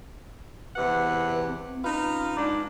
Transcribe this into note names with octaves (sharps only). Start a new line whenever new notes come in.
E2 C3 B4 F#5
C4
C#4 D#4 F4 B4
G#2 D4 D#4